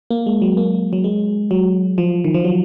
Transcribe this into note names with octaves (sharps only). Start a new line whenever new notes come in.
A#3
G#3
F#3
A#3
F#3
G#3
F#3
F3
D#3
F3
F#3